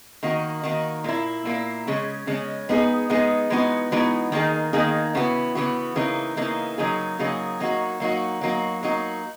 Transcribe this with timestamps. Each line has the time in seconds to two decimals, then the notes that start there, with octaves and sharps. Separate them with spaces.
0.23 D#3 A#3 D#4 F#4
0.63 D#3 A#3 D#4 F#4
1.04 A#2 A#3 E4
1.45 A#2 A#3 E4
1.87 C#3 G#3 C#4
2.27 C#3 G#3 C#4
2.69 G#3 B3 D#4 G#4
3.10 G#3 B3 D#4 G#4
3.50 E3 G#3 B3 D#4 F#4
3.92 E3 G#3 B3 D#4 F#4
4.32 D#3 A#3 D#4 G#4
4.73 D#3 A#3 D#4 G#4
5.15 C#3 E3 B3 F#4
5.55 C#3 E3 B3 F#4
5.96 C#3 E3 A#3 D#4
6.37 C#3 E3 A#3 D#4
6.78 C#3 F#3 A#3 D#4 G#4
7.19 C#3 F#3 A#3 D#4 G#4
7.60 F#3 A#3 D#4 F#4
8.00 F#3 A#3 D#4 F#4
8.41 F#3 A#3 D#4 F#4
8.83 F#3 A#3 D#4 F#4